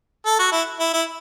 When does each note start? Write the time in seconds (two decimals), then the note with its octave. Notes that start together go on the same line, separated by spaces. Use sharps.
0.26 A4
0.39 F#4
0.52 E4
0.80 E4
0.93 E4